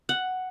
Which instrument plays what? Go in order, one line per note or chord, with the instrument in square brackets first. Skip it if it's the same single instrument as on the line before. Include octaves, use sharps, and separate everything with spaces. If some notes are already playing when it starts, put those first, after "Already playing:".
[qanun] F#5